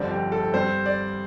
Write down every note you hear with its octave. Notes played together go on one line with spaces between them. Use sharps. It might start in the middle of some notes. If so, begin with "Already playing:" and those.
Already playing: G1 F2 D3 G3 C4 D5
G4
A4
G2 G3 C4 C5
D5